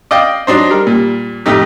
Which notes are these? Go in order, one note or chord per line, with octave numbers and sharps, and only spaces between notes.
D5 D#5 F5 G5
F#3 D4 D#4 C5
G3 A#4
A#2 G3
A1 F2 A3 D#4 G4